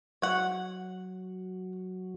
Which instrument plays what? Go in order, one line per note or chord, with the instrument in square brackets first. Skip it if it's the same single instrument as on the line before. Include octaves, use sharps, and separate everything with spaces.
[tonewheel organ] F#3 [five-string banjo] C#5 F#5